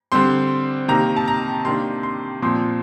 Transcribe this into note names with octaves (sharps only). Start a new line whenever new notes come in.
D3 G3 C4 C6
C3 D#3 A#3 A#5
A5
A#5
C3 D#3 A#3 D4 C6
C6
A#2 F3 C4 C6